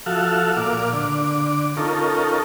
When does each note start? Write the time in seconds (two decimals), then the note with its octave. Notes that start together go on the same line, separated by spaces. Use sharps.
0.06 F3 F#4 A4 E5 F5
0.57 A#2 F5 D6
0.93 D3 D6
1.77 C#4 D#4 F4 A4 A#4